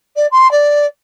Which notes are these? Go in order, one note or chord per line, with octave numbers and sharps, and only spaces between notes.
D5
C6
D5